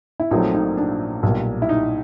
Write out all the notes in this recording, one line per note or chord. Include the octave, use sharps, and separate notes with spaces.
E4
A#1 A#2 F#3 A3 C4 D#4
D#4
D4
B1 A#2 G3
E4
D#4